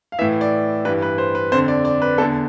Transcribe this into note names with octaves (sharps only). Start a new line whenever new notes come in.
F5
A2 E3 E5
D5
G2 E3 B4
B4
C5
B4
F2 D3 C5
D5
D5
B4
E2 D3 A4